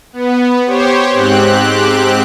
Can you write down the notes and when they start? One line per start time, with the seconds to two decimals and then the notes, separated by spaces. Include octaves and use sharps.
0.13 B3
0.67 G4 C5 C#5
1.14 G#2 C4 G4 F#6